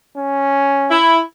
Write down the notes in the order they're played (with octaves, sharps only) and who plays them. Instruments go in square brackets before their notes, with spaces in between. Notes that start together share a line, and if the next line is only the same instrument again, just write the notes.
[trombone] C#4
[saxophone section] E4